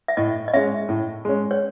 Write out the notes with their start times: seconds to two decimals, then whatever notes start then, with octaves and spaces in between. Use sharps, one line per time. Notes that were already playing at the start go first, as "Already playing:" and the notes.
0.08 E5
0.17 A2 D#5
0.48 D#5
0.54 G#3 C#4 E5
0.89 A2
1.25 G#3 C#4
1.51 C#5